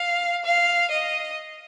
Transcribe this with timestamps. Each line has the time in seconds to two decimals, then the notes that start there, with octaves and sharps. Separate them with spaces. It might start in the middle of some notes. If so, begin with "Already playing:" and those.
Already playing: F5
0.45 F5
0.91 D#5